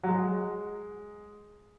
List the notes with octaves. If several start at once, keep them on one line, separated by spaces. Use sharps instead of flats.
F#3
G#3